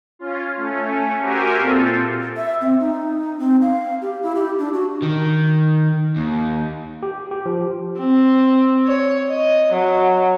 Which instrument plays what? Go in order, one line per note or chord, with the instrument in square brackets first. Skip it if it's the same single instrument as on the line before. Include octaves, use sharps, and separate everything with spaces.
[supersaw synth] C#4 F4
A3 C#4
F#4 G4 A#4 C5 E5 G#5
A#2 C4 F4 A4
[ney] E5
C4
D#4
C4
F5
G4
E4
G4
D4
F#4
[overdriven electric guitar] D#3
D#2
[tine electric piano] G4
G4
F3
[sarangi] C4
C#5
D#5
F#3